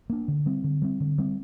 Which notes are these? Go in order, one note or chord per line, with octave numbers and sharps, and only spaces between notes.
A#3 D4
D3
G3 C4
D3
G3 C4
D3
G3 C4